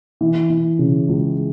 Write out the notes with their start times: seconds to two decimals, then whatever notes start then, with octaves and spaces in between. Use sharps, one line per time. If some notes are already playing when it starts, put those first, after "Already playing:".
0.21 E3
0.50 E3
0.79 C#3
1.08 C#2